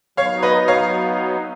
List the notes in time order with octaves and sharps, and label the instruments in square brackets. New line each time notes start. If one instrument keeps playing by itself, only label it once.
[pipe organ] F#3 B3 D#4 [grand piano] C#5 F5
[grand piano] B4 D#5
C#5 F5